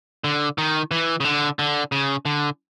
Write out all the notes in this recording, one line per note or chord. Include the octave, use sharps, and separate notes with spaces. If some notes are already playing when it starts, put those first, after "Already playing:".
D3
D#3
E3
C#3
D3
D3
C#3
D3